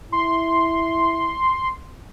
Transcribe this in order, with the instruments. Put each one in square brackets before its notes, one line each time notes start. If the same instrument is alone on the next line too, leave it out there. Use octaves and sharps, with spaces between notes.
[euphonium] E4 [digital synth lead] C6